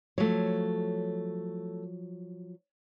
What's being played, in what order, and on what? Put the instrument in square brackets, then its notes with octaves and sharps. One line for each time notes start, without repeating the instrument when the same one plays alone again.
[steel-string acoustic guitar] F3 F#3 [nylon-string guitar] A3 C#5